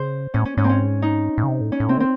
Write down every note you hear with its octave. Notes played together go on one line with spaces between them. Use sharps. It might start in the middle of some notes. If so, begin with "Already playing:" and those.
Already playing: C#3 C5
A2 C#4
C#4
G#2 C#4
C4
C#4
D#4
A2
C#3
C3
A2
C#4
A2
C3 C4
D#3
C4